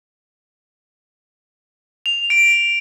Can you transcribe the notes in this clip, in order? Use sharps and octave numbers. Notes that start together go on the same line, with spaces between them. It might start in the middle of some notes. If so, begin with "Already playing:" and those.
F7
D7